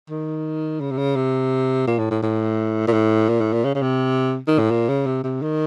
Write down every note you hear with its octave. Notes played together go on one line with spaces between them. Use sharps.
D#3
C#3
C3
C#3
C3
A#2
A2
A2
A2
A#2
A2
A#2
A2
A#2
C#3
C#3
C3
D#3
A2
A#2
C#3
C3
C3
D#3